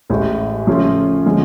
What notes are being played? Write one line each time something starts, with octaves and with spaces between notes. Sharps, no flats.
A1 A2 G#3
C#3 F3 A3 C#4 F4
D3 F3 G#3 C#4